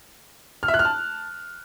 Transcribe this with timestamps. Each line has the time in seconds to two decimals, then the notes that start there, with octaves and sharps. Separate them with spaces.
0.63 F6
0.68 E5
0.74 F#6
0.79 F6
0.85 A5